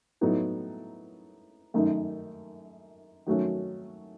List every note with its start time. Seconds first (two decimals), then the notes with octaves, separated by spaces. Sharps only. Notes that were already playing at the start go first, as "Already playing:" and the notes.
0.21 A2 F#3 B3 D#4 A4
1.74 F#2 D#3 A3 D#4
3.26 D#3 F#3 A3 C#4 F#4